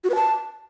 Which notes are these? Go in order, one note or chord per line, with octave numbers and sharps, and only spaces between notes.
F#4
B4
A5